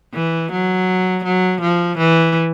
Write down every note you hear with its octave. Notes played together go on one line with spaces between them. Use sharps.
E3
F#3
F#3
F3
E3